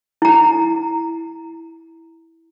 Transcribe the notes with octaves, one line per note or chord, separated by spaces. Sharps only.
E4 A#5